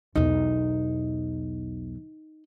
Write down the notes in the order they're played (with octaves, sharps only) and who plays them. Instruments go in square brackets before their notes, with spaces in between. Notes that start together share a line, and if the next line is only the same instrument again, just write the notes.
[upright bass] B1 E2 [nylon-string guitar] D#4